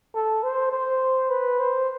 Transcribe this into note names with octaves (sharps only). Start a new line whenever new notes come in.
A4
C5
C5
B4
C5